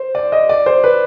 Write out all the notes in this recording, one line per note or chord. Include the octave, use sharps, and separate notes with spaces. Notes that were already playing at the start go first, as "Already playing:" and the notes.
Already playing: C5
D5
D#5
D5
C5
B4